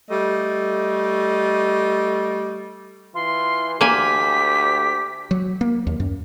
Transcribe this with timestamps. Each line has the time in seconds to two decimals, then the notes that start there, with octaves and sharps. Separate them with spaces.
0.10 G3 A3 D#5
3.15 E3 F4 C6
3.81 D2 A#3 G4 G#5 B6
5.31 F#3
5.61 A#3
5.87 D#2
6.00 F#2